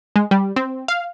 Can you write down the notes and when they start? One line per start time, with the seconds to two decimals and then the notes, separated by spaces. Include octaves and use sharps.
0.16 G#3
0.31 G3
0.56 C4
0.88 F5